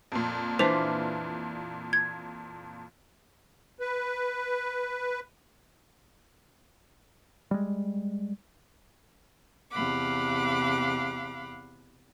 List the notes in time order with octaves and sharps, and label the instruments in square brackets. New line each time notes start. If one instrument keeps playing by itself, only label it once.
[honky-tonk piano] F2 A#2
[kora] E3 D4 F4 [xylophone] C5 F7
[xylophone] G#6
[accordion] B4
[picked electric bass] G3 G#3
[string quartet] E2 C3 F5 F#5 B5 D6